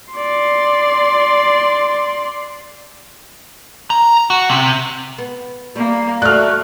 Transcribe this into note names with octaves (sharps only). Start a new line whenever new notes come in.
D5 C6
A#5
F#4
C3
B3
G3 A#3
A3 F#4 D5 F6 F#6